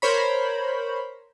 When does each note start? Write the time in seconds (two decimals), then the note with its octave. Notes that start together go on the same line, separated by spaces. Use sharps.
0.02 A#4 C5 C#5 B5